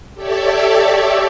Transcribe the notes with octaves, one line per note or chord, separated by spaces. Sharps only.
G4 A4 C#5 D5 E5